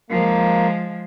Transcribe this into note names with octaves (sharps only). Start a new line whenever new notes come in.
F3 G#3 A#3